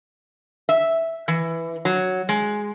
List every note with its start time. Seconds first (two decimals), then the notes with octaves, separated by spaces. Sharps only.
0.69 E5
1.28 E3
1.85 F#3
2.29 G#3